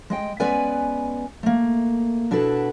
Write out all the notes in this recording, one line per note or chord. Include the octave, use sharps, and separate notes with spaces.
G#3 D#5 G5
G#3 B3 C#4 B4 D5 G#5
A3 A#3
B2 D4 E4 F#4 A4 B4